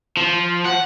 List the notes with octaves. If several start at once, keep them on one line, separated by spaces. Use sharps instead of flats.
F3
F#5